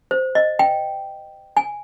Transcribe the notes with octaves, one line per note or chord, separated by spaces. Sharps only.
C5
D#5
G5
G#5